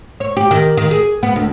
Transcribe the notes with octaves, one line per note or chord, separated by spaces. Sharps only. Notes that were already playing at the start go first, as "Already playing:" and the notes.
C#5
G4
D#3
D#3
G#4
B3
D2